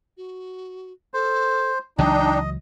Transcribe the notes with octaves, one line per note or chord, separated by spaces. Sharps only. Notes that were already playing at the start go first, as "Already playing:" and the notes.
F#4
A4 C5
C#2 E3 F#3 D4 D#4 D#5 G5